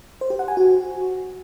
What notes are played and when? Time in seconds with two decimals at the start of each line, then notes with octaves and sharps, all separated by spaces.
0.21 C5
0.30 G4
0.39 F#5
0.48 G#5
0.57 F#4